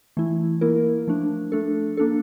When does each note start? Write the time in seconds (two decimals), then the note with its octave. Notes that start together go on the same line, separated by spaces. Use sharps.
0.17 E3 A3 E4
0.61 A#3 E4 A#4
1.07 F3 A3 D4
1.52 A3 D4 A4
1.97 A#3 D4 A4